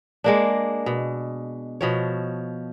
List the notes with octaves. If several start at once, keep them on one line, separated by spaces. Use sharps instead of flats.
G#3 A#3 D4
B2
B2 F3 C#5